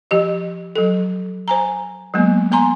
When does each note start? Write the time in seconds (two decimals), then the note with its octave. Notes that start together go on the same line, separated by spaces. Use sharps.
0.11 F3 G4 D#5
0.76 F#3 A4
1.48 C5 G#5 A#5
2.14 F#3 G#3 A#3 B3
2.52 B3 G#5 A#5 C6